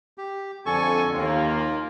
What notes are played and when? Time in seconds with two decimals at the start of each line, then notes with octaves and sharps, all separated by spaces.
0.18 G4
0.66 F2 D3 A4 G#5 C#6
1.13 D#2 A#3 F4